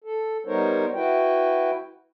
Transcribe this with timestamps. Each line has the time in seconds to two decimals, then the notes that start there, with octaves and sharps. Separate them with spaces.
0.04 A4
0.46 G3 B3 D#4 A#4 C5 C#5
0.94 E4 F#4 B4 G5